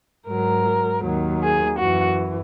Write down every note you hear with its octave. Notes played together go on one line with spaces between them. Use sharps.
G#2 F#3 A#4
D#2 D#3 F#3
G#4
F#2 E3 F#4